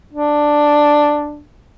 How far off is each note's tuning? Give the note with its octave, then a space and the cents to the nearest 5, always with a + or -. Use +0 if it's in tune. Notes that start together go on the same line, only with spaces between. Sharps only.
D4 +5